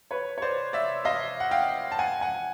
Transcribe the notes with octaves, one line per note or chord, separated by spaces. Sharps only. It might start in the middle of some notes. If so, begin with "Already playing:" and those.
B4 C#5
C#5
C5 D5
D5 E5
D#5 F5
F#5
F5 G5
A5
F#5 G#5
F#5 G#5